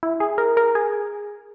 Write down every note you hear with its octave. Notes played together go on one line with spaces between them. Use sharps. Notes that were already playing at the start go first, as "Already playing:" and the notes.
E4
G#4
A#4
A#4
G#4